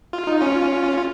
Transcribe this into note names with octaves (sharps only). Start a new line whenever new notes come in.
F4
D#4
C#4 F4
F4